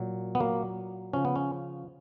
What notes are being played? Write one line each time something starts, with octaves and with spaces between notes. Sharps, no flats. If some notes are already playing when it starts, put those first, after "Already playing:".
Already playing: A#2 F#3
B3
A#2 F#3 A#3
C#3 F3 C#4
B3
C#4